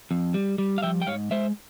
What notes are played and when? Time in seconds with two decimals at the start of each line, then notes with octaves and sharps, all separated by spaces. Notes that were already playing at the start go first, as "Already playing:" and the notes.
0.11 F2
0.34 G3
0.58 G3
0.78 F5
0.82 F3 E5 G5
1.02 G5
1.07 G#2 C#5 F5
1.31 G#3 C5 E5